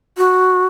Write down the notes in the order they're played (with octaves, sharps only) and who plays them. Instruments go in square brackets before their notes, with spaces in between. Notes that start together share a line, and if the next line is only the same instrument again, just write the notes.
[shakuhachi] F#4